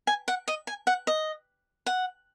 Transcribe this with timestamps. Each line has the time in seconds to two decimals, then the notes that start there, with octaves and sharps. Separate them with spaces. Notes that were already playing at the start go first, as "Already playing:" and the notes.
0.07 G#5
0.28 F#5
0.48 D#5
0.67 G#5
0.87 F#5
1.07 D#5
1.86 F#5